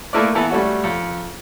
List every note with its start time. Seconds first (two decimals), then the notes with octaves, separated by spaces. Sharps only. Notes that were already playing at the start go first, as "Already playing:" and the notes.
0.13 A3 A#3 E4 A#4 B4 D5
0.35 E3 B3 E4 A4
0.50 G3 A3 C#4 F#4
0.84 F2